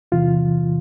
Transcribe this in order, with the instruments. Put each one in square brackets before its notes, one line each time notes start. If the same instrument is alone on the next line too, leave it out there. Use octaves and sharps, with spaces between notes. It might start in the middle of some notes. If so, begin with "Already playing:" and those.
[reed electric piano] E2 C3 E3 F4